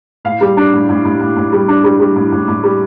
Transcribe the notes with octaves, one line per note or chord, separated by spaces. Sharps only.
A2 F5
G3
D4
A2
A2
A2
A2
A2
G3
D4
G3
G3
A2
A2
A2
G3